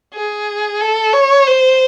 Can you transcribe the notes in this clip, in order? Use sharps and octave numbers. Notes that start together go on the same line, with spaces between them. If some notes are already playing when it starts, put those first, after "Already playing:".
G#4
A4
C#5
C5